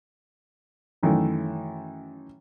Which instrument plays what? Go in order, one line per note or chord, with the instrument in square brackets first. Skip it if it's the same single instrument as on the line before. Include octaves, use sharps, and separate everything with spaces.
[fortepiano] F#2 D#3 E3 A3